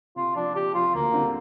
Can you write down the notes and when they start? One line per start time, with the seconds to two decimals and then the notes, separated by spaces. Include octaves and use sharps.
0.16 C3 F4
0.36 F3 C4 D4
0.55 C3 G4
0.74 F3 C4 F4
0.94 D2 A#3
1.14 D3 G3 C4 F4